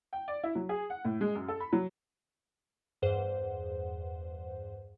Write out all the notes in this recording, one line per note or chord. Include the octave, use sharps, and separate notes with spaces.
G5
D5
E4
F#3
G#4
F#5
A2
G#3
F#2
A4
B5
F#3
E2 G2 G#4 C5 F#5